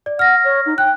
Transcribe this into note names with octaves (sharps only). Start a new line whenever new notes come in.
D5
F#5 F6 A#6
C#5
D#4
G5 F#6